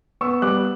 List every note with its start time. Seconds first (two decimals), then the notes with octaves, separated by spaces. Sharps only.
0.21 B3 C#6 E6
0.42 G3 D6 F#6